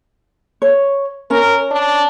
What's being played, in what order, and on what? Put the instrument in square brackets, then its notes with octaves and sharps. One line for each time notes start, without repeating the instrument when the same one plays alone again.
[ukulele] C#5
[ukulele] C#4 [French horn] A#4
[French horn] D4